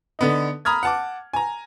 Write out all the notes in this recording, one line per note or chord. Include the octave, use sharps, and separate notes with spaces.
D3 B3 D#4
A#5 B5 D#6 F6 G#6
F#5 A5 D6
G#5 A#5